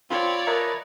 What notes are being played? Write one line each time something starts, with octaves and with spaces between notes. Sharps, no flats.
C4 F4 C#5 D5 B5
A#4 B4 D#5 E5 A5 A#5